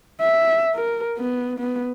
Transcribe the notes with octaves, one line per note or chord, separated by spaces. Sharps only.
E5
A#4
B3
B3